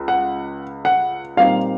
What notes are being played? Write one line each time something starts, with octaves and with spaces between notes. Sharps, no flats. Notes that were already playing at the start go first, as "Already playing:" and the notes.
Already playing: C#2
F#5
F#5
A#2 G3 C4 D#4 F5